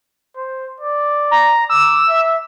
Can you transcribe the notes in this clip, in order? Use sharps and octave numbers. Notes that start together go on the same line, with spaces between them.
C5
D5
A#5
D6 E6
E5